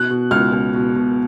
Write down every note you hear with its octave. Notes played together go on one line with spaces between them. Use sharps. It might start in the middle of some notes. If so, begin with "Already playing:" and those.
Already playing: B2 F#6
B2
C#2 F6
C#2
B2
B2